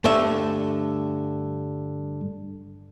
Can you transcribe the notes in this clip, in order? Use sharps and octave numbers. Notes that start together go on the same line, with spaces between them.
G2 D3 A3 E5